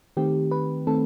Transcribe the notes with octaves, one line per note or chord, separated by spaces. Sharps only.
D#3 A3 C4 G4
B4
D#3 A3 C4 A4